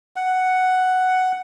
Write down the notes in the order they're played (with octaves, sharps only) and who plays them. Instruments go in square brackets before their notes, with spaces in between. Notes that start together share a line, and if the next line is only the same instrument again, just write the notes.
[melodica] F#5